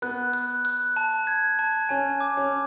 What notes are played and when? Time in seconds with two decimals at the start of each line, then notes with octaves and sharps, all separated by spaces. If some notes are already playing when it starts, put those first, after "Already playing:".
0.02 B3 F#6
0.34 F#6
0.65 F#6
0.97 A5
1.27 G#6
1.59 A5
1.89 C#4 G#5
2.20 D6
2.37 C#4